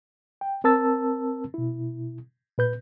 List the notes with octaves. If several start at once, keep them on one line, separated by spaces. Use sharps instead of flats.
G5
C4 A#4 A5 E6 A6
B2 E4
A#2 B4 G6